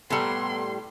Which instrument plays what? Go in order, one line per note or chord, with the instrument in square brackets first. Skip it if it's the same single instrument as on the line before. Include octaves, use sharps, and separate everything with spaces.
[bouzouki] A2 G3 [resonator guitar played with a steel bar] B3 A4 A#5 [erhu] C6